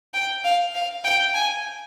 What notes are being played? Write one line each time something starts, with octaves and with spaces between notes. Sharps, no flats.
G5
F5
F5
G5
G#5